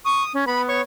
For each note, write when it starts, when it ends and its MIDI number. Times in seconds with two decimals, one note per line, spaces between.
0.05 0.23 85
0.05 0.32 87
0.34 0.44 61
0.47 0.81 59
0.47 0.62 83
0.69 0.81 73
0.69 0.81 85